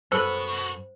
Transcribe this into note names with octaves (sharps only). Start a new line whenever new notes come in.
F#2 B3 F#4 A4 B4 C5